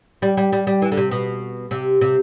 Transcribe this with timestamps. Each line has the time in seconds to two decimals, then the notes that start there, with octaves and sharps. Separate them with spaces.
0.22 G3
0.37 G3
0.53 G3
0.67 G3
0.82 E3
0.92 D3
0.97 C3
1.11 B2
1.71 C3
2.01 C3